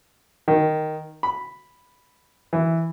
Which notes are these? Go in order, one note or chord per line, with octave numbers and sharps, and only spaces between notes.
D#3
B5
E3